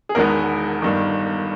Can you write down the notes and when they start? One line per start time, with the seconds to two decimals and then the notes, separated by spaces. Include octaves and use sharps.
0.09 G#4
0.15 E1 E2 D#3 G#3 B3 A#4
0.82 G1 G2 D#3